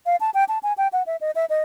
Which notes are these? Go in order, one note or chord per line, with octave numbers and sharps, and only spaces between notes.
F5
A5
G5
A5
G#5
G5
F#5
E5
D#5
E5
D#5